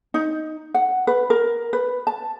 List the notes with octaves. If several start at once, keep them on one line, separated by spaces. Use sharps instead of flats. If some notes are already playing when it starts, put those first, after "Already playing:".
D#4
F#5
B4
A#4
B4
A5